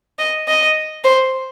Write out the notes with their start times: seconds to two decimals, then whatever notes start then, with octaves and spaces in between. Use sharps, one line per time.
0.19 D#5
0.48 D#5
1.04 C5